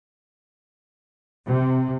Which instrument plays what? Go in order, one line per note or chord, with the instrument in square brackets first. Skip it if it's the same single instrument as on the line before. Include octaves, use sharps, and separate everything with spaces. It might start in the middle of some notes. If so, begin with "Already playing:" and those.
[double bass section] C3